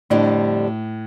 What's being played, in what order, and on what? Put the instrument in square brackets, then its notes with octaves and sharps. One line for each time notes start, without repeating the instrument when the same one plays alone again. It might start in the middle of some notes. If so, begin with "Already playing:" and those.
[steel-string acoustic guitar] F2 D3 G3 D4 [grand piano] A2